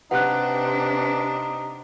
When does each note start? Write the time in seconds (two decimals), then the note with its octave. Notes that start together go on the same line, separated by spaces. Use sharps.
0.11 C3 D4 D#4 G4 B4 F5 F#5 F#6